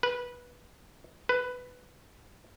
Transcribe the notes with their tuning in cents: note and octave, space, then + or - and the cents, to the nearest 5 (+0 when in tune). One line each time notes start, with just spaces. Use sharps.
B4 -15
B4 +10